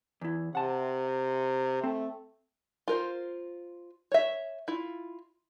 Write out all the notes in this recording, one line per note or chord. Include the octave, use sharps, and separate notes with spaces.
E2 E4
C3 F#5 A5
A3 C4
F4 A#4 C5
C#5 E5
E4 F4